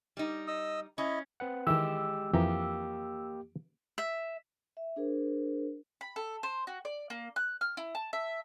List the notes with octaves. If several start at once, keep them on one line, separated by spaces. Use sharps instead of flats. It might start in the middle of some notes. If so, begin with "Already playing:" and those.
G3 D#4
D#5 D#6 E6
C#4 E4 D#5
C4 B4 F#5
D#3 E3 G#3 G4 E6
F2 E3 A#3 G4 A#5
E5
E5
D4 G#4 A#4 C5
B5
A4
C5
F#4
D5
A#3
F#6
F6
E4
A5
E5